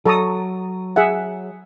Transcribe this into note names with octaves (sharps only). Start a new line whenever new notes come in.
F#3 A4 A#5 D#6
G#4 E5 F#5